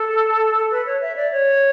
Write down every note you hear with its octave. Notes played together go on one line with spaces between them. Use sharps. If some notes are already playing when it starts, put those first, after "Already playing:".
Already playing: A4
B4
C#5
E5
D5
C#5